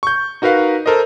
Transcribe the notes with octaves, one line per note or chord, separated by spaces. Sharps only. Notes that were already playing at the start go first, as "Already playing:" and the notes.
C#6 G6
D#4 F#4 A#4 B4 F5
A4 A#4 C5 D#5